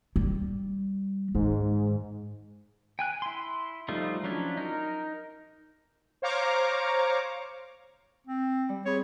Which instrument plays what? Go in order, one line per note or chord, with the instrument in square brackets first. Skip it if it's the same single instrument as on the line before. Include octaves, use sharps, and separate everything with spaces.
[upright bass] G3
[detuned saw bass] G#2 [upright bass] D#3
[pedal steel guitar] G5 G#5 F#6
E4 C6
F3 G3 A3 D#4 F4
F3 F#3 C#4 D4 E4
D#4 A#4
[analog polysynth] C5 C#5 F5 A#5 C#6 D6
[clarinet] C4
[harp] G3
[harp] C4 G#4 B5 [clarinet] C#5